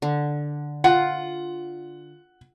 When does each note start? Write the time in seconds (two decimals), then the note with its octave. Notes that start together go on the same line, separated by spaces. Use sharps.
0.02 D3
0.84 F4 F#5